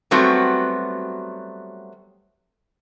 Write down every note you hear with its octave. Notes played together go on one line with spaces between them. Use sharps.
F#3 G3 A3 B3 C4 F#4